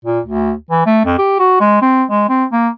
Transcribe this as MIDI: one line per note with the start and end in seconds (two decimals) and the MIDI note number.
0.05 0.20 46
0.25 0.53 38
0.71 0.86 52
0.86 1.01 57
1.05 1.16 41
1.18 1.36 67
1.39 1.58 66
1.60 1.80 56
1.82 2.04 60
2.11 2.25 56
2.29 2.45 60
2.52 2.69 58